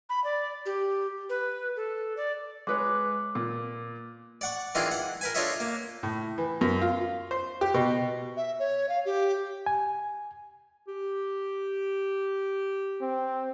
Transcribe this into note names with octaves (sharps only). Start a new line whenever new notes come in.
B5
D5
G4
B4
A4
D5
G#3 B4 C#5 D6 F#6
A#2
D5 F#5 C#6
D#3 E3 D4 F4 G#4
F#5
A#4 B4 G#5
D4 F4 A4 C#5 D#5 E5
A#3
A2
E3
F#2
F4
C5
G4
B2
E5
C#5
F5
G4
G#5
G4
C4